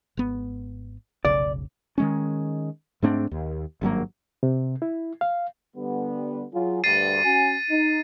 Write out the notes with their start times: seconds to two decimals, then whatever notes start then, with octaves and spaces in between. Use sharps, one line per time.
0.17 G#1 B3
1.25 F1 B1 C#3 D5
1.98 D#3 G#3 C#4
3.02 G#2 A3 C4 D4
3.31 D#2
3.81 G#1 G2 F#3 A#3
4.43 C3
4.82 E4
5.21 F5
5.76 D3 G3 B3
6.53 F#3 F4 G#4
6.84 D2 G2 A6 C7 D#7
7.24 C#4 F#4 G#5
7.70 D#4